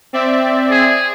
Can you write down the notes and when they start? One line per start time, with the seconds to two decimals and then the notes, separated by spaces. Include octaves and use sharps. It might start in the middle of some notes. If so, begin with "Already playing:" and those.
0.13 C4 D5 E5
0.71 G#4